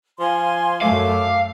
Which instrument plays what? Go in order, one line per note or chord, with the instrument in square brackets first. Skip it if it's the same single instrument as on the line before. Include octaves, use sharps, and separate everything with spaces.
[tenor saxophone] F3 [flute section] F5 G#5 C6
[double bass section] F#2 A3 [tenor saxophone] A4 [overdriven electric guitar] F5 [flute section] D6